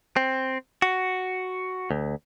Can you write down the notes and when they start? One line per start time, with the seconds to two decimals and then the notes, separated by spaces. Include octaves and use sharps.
0.16 C4
0.82 F#4
1.91 D2